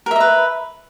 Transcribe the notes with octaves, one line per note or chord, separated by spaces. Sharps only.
A#4 B4 D#5 E5